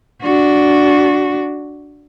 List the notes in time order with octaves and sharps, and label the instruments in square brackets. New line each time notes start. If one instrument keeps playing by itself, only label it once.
[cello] D4 F#4